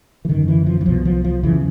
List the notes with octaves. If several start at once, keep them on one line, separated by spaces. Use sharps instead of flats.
E3
F#2 D3 D#3
E3
F3
E3
C2 B2 F3
F3
F3
F2 C#3 E3